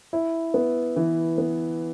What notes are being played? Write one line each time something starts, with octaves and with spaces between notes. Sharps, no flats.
E4
B3
E3
B3